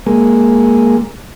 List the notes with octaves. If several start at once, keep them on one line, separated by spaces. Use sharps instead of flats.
G#3 A#3